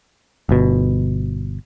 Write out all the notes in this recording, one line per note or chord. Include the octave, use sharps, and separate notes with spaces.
G1 B2